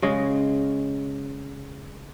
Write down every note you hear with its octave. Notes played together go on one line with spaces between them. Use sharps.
C#3 G#3